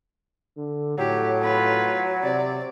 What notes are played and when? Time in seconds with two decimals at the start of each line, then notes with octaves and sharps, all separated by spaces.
0.57 D3
0.98 A2 F#3 G4
1.42 F4 B4
2.24 C3 D5